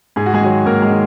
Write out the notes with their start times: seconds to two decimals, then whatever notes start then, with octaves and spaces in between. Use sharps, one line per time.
0.16 G#2 G#4
0.26 F#4
0.34 G#3 G#4
0.41 D#3 F#3
0.66 G#2 A#3 A#4
0.82 G#3 G#4
0.91 D#3